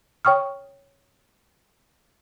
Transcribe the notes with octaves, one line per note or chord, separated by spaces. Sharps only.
C#5 G5 C#6 D#6 F6